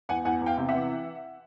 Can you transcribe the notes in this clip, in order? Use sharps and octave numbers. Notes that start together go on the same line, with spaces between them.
E2 F#5 G#5
E2 F#5 G#5
E2
F5 G5
C3
E5 F#5
E3